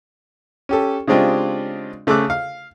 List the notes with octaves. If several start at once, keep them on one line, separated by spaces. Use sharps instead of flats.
C#4 G4 A4
C#3 G#3 C4 D4 F4 G4
C#3 A3 G#4 D6 E6 F#6
F5